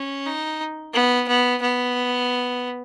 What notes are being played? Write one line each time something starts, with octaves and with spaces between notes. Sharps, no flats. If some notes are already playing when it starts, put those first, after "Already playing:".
Already playing: C#4
D#4
B3
B3
B3